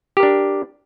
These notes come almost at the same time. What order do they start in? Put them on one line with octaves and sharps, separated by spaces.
G4 A#4 D4